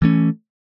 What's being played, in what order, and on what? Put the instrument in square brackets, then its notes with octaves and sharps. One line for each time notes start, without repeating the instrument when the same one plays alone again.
[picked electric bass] E3 A3 C#4